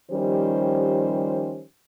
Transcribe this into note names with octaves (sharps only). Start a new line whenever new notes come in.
D#3 F3 G3 C#4 G4 C5